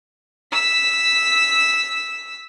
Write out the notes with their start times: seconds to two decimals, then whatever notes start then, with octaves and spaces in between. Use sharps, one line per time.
0.52 E6 B6